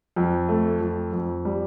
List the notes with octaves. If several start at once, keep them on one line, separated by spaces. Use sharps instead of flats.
F2
A3
F2
F2
G3